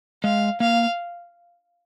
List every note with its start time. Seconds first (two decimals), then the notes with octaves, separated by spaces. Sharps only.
0.23 G#3 F5
0.60 A#3 F5